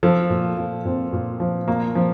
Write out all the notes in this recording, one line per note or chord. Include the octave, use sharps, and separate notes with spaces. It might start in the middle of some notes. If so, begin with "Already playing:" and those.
F3 A4
A#2
F3
A#2 C4
A#2
F3
A#2 A#3
F3